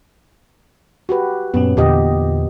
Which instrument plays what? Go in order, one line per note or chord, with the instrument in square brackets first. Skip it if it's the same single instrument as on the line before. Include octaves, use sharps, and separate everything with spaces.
[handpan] F#4 G4 B4
[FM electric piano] F#2 A#2 C#4 [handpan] B3
[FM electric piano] E2 D3 [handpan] A#2 G4 D#5